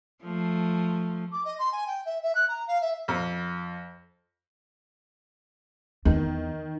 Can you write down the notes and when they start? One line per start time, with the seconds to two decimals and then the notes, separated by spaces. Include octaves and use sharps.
0.23 F3 A3
1.31 D6
1.45 D#5
1.59 C6
1.72 G#5
1.87 G5
2.05 E5
2.22 E5
2.35 F#6
2.48 A#5
2.67 F5
2.81 E5
3.08 F2
6.05 E2 D#3